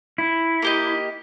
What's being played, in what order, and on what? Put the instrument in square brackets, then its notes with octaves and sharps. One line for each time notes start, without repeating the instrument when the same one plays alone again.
[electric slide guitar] E4
[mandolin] A#3 G4 D#5